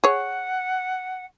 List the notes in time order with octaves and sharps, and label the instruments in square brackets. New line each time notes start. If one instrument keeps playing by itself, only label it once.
[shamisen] G#4 C#5 [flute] F#5